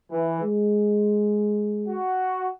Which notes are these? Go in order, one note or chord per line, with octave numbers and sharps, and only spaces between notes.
E3
G#3
F#4